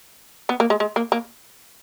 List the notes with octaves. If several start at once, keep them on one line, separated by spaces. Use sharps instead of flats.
B3
A#3
G#3
G#3
A#3
A#3